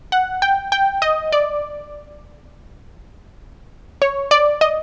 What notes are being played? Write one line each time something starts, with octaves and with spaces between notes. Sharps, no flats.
F#5
G5
G5
D#5
D5
C#5
D5
D#5